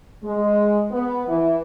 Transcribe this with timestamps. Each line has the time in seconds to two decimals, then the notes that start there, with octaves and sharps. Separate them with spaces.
0.24 G#3
0.91 B3
1.28 E3